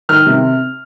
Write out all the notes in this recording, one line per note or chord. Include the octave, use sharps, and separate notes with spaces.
D#3 F6
C3